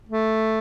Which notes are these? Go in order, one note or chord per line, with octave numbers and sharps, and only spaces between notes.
A3